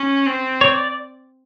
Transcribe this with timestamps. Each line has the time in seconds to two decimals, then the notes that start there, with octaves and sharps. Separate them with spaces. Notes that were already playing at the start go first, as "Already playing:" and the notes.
Already playing: C#4
0.27 C4
0.61 C#5
0.72 D5